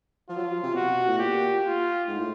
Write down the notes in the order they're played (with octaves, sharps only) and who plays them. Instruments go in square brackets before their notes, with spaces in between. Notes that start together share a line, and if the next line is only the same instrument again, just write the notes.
[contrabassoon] F3 [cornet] F4
[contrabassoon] F#3
F3
C3
[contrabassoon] B2 [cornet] F#4
[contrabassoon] A2
[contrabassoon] A#2 [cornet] G4
[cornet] F4
[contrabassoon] G#2
A2